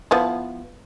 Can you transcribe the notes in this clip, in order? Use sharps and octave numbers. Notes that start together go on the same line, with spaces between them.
F3 B3 E4